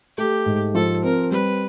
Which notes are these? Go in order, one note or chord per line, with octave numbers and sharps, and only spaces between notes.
A3 G4
G#2
F3 A4
C4 A#4
G3 B4